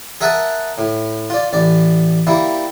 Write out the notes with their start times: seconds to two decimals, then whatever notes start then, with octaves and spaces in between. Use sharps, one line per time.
0.21 G#4 A#4 E5 F#5 G#5 A5
0.78 A2
1.30 F4 D5
1.53 A1 D5
2.27 G3 A#3 E4